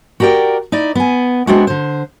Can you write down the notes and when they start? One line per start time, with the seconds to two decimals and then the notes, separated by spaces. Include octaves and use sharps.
0.20 F#4 G4 A#4 D5 G5
0.72 D#4 E4 D5
0.95 B3 G#5
1.47 G#3 B3 C4 D4 E4 F#4
1.67 D3 C5